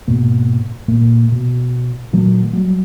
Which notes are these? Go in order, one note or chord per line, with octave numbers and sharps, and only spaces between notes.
G#2 B2 A#3
A#2 A3 A#3
B2
A#2 D#3 F#3 A3
F#3 G3 A3